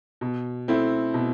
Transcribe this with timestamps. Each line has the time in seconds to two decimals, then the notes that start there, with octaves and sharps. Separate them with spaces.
0.21 B2
0.68 A3 C4 E4
1.14 B2